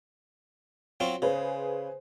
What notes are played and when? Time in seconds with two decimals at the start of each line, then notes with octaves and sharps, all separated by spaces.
1.00 F#3 C4 F4
1.22 C#3 G#4 B4 C5